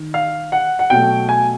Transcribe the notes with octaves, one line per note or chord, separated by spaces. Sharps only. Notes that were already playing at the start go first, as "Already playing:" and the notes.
Already playing: D#3
F5
F#5
F#5
B2 F#3 A3 G5
G#5